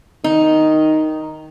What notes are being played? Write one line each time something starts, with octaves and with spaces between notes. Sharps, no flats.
D#3 D#4